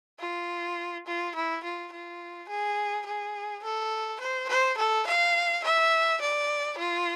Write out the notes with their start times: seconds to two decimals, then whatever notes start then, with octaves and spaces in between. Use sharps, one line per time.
0.20 F4
1.07 F4
1.36 E4
1.64 F4
1.93 F4
2.49 G#4
3.06 G#4
3.64 A4
4.21 C5
4.49 C5
4.78 A4
5.07 F5
5.64 E5
6.22 D5
6.78 F4